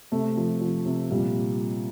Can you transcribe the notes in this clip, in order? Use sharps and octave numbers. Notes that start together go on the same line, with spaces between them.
C3 A3
F3
F3
C3
A#2 G3